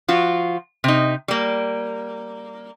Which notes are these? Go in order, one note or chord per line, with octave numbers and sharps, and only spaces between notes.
F3 F4 F#4
C3 D#4
G3 A#3